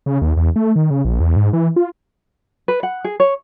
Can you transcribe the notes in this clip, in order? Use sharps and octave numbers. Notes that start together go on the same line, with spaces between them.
C#3
D#2
E2
A3
D#3
C#3
A#1
E2
G#2
E3
F4
B4
F#5
G#4
C#5